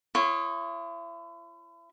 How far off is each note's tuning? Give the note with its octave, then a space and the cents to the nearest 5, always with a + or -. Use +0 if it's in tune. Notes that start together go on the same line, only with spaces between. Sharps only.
E4 +40 C#5 -20 D#6 +0